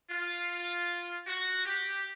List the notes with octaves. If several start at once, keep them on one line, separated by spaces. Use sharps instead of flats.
F4
F#4
G4